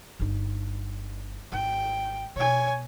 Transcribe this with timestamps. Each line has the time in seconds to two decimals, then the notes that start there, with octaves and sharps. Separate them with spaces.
0.20 G1 D#4
1.52 G#1 G5
2.36 B2 C#5 G#5